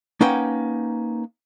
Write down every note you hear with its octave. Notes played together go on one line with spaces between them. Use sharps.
A#3 C#4 D#4 B4 F#5 G5